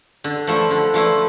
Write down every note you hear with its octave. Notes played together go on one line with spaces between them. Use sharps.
D3
F3 A3 E4
D3
F3 A3 E4